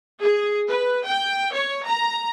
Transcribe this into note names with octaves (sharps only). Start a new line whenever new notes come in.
G#4
B4
G5
C#5
A#5